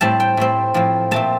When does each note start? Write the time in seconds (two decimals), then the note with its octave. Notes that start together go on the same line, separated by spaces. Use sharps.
0.01 A2 G3 C4 A5
0.20 G5
0.37 A2 G3 C4
0.74 A2 F3 C4
1.11 A#2 A3 C4 A5